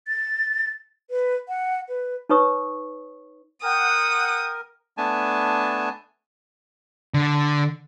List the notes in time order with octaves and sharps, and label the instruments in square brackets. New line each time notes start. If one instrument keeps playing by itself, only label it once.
[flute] A6
B4
F#5
B4
[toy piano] D#4 B4 C#5 A#5 C#6 D#6
[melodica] A#4 [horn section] F#5 G5 [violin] D#6
[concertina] A3 B3 D4 G#5 A5
[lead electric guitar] D3